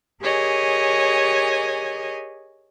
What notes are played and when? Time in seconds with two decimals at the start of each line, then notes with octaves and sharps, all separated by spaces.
0.22 G4 G#4 A#4 C#5 D#5 G#5